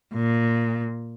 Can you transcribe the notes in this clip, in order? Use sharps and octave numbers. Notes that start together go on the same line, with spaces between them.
A#2